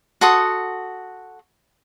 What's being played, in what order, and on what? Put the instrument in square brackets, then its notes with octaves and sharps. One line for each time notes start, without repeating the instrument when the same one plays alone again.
[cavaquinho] F#4 A4 C6 D#6